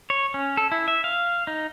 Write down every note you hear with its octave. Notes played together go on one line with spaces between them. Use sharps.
C#5
C#4
A4
E4
E5
F5
D#4